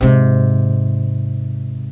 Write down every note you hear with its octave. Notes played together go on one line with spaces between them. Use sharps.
G#2 C3